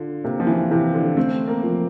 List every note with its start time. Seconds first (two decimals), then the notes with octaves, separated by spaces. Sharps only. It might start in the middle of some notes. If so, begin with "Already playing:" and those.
Already playing: D3 F4
0.24 C3 A#3
0.40 F3
0.47 E3
0.71 C3 E3
0.94 D3
1.17 A3 C4
1.48 A#3
1.64 F3